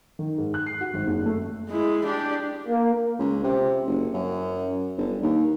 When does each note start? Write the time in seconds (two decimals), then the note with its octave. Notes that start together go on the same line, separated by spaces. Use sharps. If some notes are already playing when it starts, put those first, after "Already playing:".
0.19 D#3
0.38 G#2
0.54 F#6
0.66 C7
0.81 F#4
0.94 G#1
1.07 F#1
1.26 A3
1.70 G#3 E4
2.04 D4 G4
2.68 A#3
3.19 C#2
3.44 C3
3.87 F#1
4.14 F#2
4.97 G1
5.22 D#2